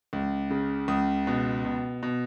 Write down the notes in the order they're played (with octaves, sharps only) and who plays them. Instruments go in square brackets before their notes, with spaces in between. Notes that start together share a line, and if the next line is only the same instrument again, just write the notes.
[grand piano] C#2
C#3
C#2 D#6
B2
B2
B2